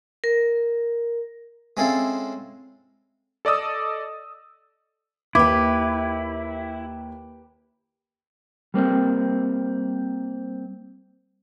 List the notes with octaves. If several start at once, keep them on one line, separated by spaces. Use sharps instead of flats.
A#4
G#3 C4 C#4 E4 A4 F5
A4 D5 D#5 D#6 E6
D#2 E4 G4 B4 D6
G3 A#3 C4